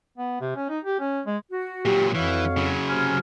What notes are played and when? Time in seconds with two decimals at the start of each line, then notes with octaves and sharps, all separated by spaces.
0.18 B3
0.41 C3
0.56 C#4
0.69 D#4
0.84 G4
1.00 C#4
1.26 G#3
1.52 F#4
1.85 A#2 F#3 G4
2.15 F2 E3 F#4 C#5 F5
2.57 C#3 F#3
2.89 C3 G#5 F6